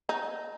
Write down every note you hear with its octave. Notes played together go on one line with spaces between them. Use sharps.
D#4